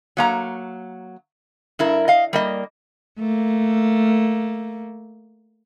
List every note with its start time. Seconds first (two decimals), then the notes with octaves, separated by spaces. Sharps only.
0.17 F#3 A#3 A#5
1.79 G2 E4 A#4
2.08 D#5 F5
2.33 G3 A#3 D#5
3.18 A3 A#3